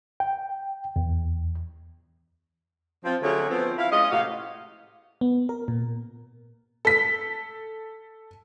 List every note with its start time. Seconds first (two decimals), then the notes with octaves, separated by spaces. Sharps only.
0.20 G5
0.96 E2
3.04 F3 C4 F4
3.22 D3 F#3 A3 C#4 G#4 C#5
3.50 F3 B3 C4
3.77 E4 F5
3.92 G#3 C#4 F4 D#5
4.11 A2 C3 F#4 F5
5.21 B3
5.49 A#4
5.68 A#2
6.85 A4 B6